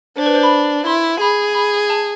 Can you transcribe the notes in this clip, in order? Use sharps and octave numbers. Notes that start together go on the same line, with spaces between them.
D4 C5
B4
C5
B5
E4 C6
G#4 B5
B5
A5